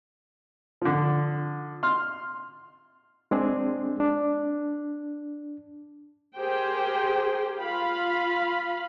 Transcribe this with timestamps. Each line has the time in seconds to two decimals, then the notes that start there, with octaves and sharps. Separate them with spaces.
0.82 D3 F3
1.83 C6 F6
3.31 G#3 C4 D4 G#4
4.00 D4
6.36 G4 G#4 A#4 C5 G5
7.59 F4 F5 B5